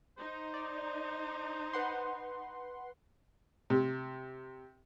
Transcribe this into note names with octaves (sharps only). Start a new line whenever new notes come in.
D#4 C5
D5
B4 F#5 C6
C3